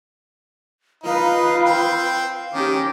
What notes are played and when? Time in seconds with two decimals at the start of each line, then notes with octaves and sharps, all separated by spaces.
1.04 D#4 F4 B4 F5
1.66 C4 G5
2.54 D#3 C#4 G4 D6